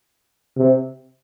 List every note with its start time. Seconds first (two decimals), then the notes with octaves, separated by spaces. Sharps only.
0.57 C3